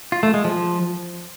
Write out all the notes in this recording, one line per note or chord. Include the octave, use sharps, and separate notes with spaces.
F4
A3
G#3
F3